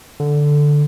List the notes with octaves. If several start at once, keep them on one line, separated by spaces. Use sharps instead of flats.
D3